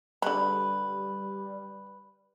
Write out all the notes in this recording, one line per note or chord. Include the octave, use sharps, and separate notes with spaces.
D3 G3 B4 B5